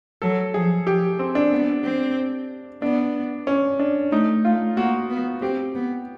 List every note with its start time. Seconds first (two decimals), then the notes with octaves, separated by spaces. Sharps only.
0.22 F#3 A4
0.54 F3 G#4
0.87 F3 G4
1.19 C4
1.35 D4
1.52 B3
1.84 C4
2.82 B3 D4
3.47 C#4
3.80 D4
4.11 A3 D#4
4.45 A3 F4
4.77 A#3 F#4
5.10 B3
5.42 C4 G4
5.75 B3